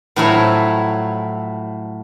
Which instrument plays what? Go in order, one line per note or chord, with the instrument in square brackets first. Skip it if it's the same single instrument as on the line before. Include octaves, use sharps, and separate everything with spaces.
[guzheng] A2 F3 F#3 E4 C#5